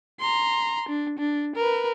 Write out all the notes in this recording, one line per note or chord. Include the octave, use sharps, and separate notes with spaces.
A#5 C6
D4
D4
A#4 B4